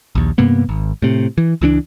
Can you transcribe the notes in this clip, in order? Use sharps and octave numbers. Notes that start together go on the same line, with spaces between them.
A#1 D#2
G2 C3 A#3 B3
G#1
A2 C3
E3
C#2 E3 C#4 D4